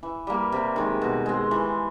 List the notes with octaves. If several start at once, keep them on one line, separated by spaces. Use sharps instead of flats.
E3
G3 A#3
C3
D#3 G#3
B2
G#3 C4
E3